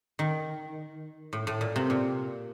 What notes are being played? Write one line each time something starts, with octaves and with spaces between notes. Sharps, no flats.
D#3
A2
A2
A#2
C3
A#2